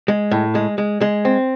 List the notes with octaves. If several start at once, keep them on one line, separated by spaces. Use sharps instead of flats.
G#3
A2
G#3
G#3
G#3
C4